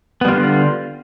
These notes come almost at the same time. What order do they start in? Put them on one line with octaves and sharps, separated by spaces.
B3 G3 F4 D3